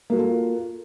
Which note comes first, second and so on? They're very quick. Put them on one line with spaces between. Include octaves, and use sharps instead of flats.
A#3 F#4 A4 F4